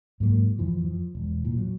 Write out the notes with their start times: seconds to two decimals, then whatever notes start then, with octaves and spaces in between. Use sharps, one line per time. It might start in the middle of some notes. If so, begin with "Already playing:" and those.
0.20 G#2 F#3 A#3
0.59 F2 E3 F3
0.85 F3
1.15 E1
1.45 A#2 E3
1.57 F#3